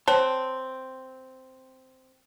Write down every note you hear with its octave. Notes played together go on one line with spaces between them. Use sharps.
C4 C#5 A5